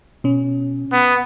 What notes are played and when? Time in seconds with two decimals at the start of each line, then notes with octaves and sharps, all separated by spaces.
0.24 B2 C#4
0.92 B3